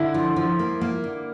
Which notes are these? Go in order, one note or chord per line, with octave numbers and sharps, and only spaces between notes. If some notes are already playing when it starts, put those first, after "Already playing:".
Already playing: D3 E4
F3
F3
A#3
A#3
D3